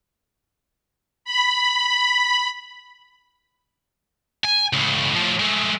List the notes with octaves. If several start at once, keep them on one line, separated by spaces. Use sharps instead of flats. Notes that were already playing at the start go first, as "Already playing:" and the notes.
B5
G#5
C#2 A2
A2 F3
G#3 A3